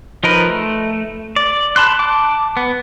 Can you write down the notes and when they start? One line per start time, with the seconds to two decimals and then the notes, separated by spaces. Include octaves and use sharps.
0.23 F3 D#4 A#4 B4
0.48 A3
1.36 D5
1.76 A5 B5 C6 F#6
1.99 A5 D6
2.57 B3